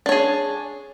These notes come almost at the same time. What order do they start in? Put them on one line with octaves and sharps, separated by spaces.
D4 C#5 G#4